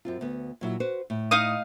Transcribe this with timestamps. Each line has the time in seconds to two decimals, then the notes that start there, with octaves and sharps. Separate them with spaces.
0.05 F#2 C4 F4
0.21 D2 B3
0.61 A#2 F#3 E4
0.80 F#4 B4 C5
1.10 A2
1.31 D#4 F5 D#6